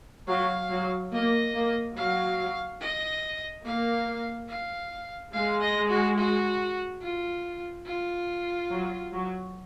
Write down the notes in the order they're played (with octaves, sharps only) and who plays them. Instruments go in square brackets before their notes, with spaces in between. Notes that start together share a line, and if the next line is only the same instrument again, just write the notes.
[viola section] F#3 [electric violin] F5
[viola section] F#3
[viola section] A#3 [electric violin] D#5
[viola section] A#3
[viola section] F#3 [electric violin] F5
[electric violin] D#5
[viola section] A#3 [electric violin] F5
[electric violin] F5
[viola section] G#3 [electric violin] F5
[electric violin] D#5
F#4
F#4
F4
F4
[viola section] F#3
F#3